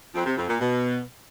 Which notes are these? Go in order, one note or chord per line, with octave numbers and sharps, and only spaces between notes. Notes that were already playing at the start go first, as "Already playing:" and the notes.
F2
C3
F2
A#2
B2